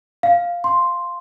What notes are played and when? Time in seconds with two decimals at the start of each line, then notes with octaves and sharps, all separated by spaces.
0.23 F5
0.64 C6